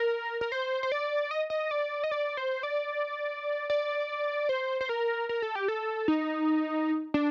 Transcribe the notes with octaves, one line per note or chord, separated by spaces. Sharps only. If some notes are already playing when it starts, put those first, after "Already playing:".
Already playing: A#4
A#4
C5
C5
D5
D#5
D#5
D5
D#5
D5
C5
D5
D5
C5
C5
A#4
A#4
A4
G4
A4
D#4
D4